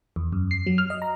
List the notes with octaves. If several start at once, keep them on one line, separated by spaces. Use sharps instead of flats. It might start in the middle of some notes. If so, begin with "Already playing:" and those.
E2
F#2
C7
F#3
F6
D#5
A#5